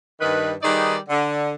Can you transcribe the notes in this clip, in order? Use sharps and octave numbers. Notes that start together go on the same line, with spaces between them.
G2 D#3 B4
D#3 G3 D#4 G#4 B4 D5
D3